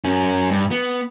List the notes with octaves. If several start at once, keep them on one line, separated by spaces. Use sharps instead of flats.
F#2 C#4
G2
B3